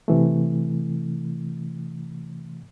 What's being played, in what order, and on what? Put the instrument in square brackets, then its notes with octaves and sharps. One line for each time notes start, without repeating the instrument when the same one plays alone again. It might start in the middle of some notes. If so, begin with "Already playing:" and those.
[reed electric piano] C3 E3 A3